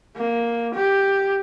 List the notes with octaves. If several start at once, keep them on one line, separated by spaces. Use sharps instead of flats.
A#3
G4